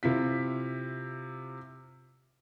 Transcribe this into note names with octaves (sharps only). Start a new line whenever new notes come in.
C3 E4 F4 B6